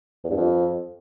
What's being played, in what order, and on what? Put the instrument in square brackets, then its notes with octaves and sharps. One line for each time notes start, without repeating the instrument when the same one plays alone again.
[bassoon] E2
G2
F2